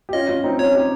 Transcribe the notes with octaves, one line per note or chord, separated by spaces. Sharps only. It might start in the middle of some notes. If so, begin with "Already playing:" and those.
G4
C#4 F4 D#5
C#4 F4
C4 D#4
C#4 F4 C#5
D#4 G4